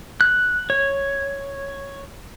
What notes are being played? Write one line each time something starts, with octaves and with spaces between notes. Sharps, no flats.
F#6
C#5